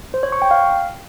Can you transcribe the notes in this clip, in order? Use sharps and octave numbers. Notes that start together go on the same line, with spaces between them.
C5
C#5
C#6
G5
F5